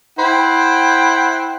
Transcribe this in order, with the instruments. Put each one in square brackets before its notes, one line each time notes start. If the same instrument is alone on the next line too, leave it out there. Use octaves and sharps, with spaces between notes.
[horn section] E4 C5 F#5 G5